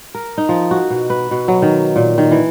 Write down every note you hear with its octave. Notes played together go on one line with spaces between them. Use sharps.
A#4
D#4
F3
F#4
B2
B4
B2
F#3
D#3
A#2
D#3
E3